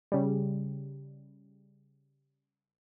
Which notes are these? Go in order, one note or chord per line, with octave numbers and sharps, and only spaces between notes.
C#3 G3